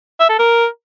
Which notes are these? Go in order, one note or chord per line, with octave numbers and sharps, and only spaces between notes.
E5
A4
A#4